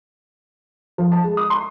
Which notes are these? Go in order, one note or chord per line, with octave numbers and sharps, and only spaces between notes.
F3
A5
G#3
D#6
C6